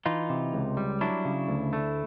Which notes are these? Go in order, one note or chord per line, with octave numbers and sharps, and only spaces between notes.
E3 D#4 F4
C3
C#2
G3
F#3 D4 E4
C#3
D2
A3